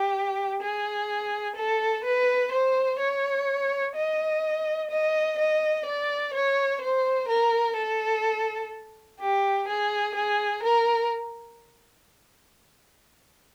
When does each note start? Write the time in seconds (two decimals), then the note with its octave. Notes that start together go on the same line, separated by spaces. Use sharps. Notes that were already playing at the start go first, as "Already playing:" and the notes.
Already playing: G4
0.62 G#4
1.56 A4
2.04 B4
2.52 C5
2.99 C#5
3.95 D#5
4.91 D#5
5.38 D#5
5.86 D5
6.34 C#5
6.81 C5
7.29 A#4
7.76 A4
9.19 G4
9.68 G#4
10.15 G#4
10.63 A#4